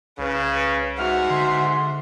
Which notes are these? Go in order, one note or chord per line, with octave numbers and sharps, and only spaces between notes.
C2 C#3 B4
G#2 F#4 E5 F6
D3 C6